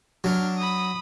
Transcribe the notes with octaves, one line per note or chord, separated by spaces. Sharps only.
F#3 D4 F6
B5 D#6